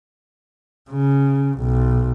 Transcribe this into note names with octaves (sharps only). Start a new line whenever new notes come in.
C#3
B1